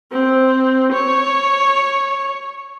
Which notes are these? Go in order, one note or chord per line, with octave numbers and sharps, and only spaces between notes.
C4
C#5